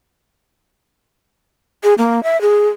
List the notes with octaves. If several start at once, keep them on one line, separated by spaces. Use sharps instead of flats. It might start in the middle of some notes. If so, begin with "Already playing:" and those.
G#4
A#3
E5
G#4